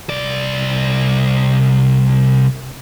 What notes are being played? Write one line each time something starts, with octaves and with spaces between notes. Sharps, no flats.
C2 D5